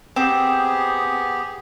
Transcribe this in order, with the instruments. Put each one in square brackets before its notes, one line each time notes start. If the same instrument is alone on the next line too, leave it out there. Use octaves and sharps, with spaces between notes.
[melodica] B3 G4 G#4 [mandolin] C4